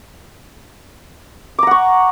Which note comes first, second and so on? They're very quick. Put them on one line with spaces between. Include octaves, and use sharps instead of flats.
D6 A#5 F#5 C#6